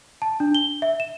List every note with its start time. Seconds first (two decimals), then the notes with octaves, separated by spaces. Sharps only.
0.22 A5
0.40 D4
0.55 G7
0.82 E5
1.00 E7